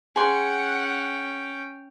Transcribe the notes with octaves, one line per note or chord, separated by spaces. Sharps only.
C#4 G#4 F#5 G5 C6